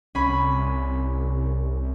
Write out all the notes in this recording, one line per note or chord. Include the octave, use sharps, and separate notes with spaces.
C2 C#4 B5